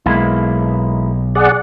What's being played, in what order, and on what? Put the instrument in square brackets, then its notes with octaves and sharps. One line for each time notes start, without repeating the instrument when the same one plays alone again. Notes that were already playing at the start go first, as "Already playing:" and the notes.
[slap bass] B1 [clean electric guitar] G#3 A#3 E4
[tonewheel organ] G#4 D5 F#5